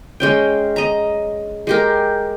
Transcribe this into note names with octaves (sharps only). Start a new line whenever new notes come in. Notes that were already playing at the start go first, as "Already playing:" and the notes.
G#3 C#4 G5
D#5 A#5
G#3 G4 A#4